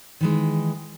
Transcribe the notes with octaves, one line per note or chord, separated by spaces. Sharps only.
D#3 E3 G#3